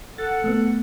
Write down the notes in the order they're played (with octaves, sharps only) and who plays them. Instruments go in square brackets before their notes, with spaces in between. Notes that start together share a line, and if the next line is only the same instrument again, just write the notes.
[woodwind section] A4 F#5 [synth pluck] A6
[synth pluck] A3 B3